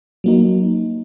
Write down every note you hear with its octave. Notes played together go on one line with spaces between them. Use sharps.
F#3 A#3 D#4